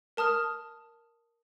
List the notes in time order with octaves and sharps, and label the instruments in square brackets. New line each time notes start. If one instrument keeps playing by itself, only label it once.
[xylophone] A#4 A5 D#6 F6